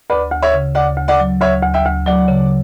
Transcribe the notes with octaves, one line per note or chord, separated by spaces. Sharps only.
D2 B4 D5
D2
C#5 E5
C#3
D2 D5 F#5
D2
D5 F#5
F#3
D2 C#5 E5
D2
E5 G5
D2
F#3 D5 F#5
C#3